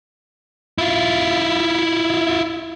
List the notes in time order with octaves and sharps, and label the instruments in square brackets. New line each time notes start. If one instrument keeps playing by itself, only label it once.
[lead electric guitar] E4 F4